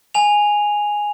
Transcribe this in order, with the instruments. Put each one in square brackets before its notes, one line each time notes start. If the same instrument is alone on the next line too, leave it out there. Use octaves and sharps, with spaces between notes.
[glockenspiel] G#5 F7